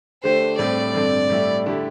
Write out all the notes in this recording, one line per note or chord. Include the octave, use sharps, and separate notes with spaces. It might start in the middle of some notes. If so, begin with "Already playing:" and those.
D3 A3 D4 G4 C5
A2 G3 C4 G4 D5
G2 D3 A3 C4
A2 G3 E4 G4
D3 A3 E4 G4